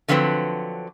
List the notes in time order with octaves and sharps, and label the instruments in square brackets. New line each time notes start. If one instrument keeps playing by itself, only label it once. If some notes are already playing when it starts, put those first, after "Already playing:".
[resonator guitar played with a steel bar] D3 F3 F#3 C4 B4